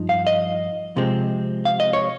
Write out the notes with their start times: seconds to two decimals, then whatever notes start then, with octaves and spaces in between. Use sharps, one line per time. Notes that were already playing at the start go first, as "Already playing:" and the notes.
Already playing: G2 F3 D#4
0.09 F5
0.27 D#5
0.97 C3 F3 G#3 C4
1.65 F5
1.80 D#5
1.93 C#5